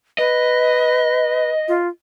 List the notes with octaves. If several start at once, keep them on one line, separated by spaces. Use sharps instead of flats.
B4 D#5
F4